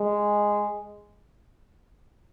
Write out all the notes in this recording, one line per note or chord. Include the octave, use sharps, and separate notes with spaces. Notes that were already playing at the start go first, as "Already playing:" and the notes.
Already playing: G#3